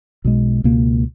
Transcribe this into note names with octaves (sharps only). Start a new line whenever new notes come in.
B1 B2 G#3
C#2 B2 A#3